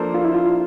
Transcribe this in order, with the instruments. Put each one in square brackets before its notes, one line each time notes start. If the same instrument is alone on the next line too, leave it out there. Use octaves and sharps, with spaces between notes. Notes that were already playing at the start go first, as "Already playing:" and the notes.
Already playing: [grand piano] F3 A#3 D4 A4 C5
[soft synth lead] F4
E4
F4